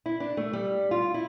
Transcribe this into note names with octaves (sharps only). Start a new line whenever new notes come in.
E4
D4
A3
G3
F4
E4